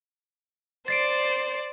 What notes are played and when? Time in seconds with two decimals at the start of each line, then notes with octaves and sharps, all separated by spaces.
0.88 C5 D5 A6 C7 D7